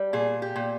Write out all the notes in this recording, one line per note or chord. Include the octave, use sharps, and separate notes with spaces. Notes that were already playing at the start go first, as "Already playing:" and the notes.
Already playing: G3
A#2 G#4
G4
A#2